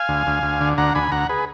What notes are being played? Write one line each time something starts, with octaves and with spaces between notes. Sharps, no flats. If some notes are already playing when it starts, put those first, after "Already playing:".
Already playing: F5 G#5
D2
D2
D2
D3
D2 F#5 A#5
D2 G#5 B5
D2 F#5 A#5
G#4 B4